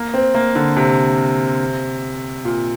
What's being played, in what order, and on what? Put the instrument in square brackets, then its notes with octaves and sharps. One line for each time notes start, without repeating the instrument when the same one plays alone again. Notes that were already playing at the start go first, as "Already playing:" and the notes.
Already playing: [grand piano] A#3
C4
A#3
D3
C3
A#2